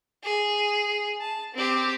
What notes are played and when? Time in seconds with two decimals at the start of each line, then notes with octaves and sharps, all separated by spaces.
0.24 G#4
1.21 A5
1.55 C4 G4